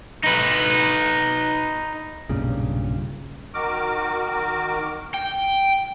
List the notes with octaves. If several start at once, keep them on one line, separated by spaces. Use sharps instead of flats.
D#4 B4
B1 G2 A#2 C#3
D#3 F#4 A#4 D6
G5